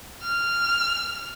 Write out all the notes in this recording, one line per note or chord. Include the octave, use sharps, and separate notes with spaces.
F6